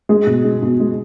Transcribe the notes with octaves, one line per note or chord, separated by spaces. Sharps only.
G#3 G#4
B2
G#3
B2
G#3